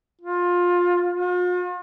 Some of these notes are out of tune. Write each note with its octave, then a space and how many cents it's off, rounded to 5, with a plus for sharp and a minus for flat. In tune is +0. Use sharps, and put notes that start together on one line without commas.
F4 +20
F4 +45